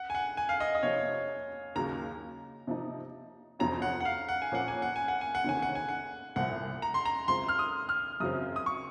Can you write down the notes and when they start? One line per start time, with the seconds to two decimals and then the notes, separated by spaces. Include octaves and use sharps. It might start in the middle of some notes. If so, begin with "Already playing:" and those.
Already playing: F#5
0.10 G#5
0.15 F#5
0.37 G#5
0.49 F5
0.60 D#5
0.75 D#5
0.83 C3 F3 A#3 C#5
1.75 D#2 C#3 F#3 A#3 A#5
2.67 C3 F3 A#3 D#4
3.59 F2 C3 F#3 C#4 F4 A#5
3.82 F#5
4.00 F#5
4.05 F5
4.29 F#5
4.42 G#5
4.52 A#2 F3 A#3 C#4 F#5
4.68 G#5
4.82 F#5
4.96 G#5
5.08 F#5
5.21 G#5
5.35 F#5
5.44 C#2 C3 D#3 A#3 C#4 G#5
5.62 F#5
5.75 G#5
5.89 F#5
6.36 C2 A#2 F3 F#5
6.82 A#5
6.94 C6
7.05 A#5
7.28 F#2 C#3 G#3 C4 F4 C6
7.48 F6
7.59 D#6
7.89 F6
8.20 F#2 C#3 F#3 C4 D#6
8.56 D#6
8.66 C#6